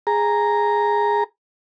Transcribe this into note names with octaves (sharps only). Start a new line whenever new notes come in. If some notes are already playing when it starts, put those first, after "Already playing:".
G#4 A#5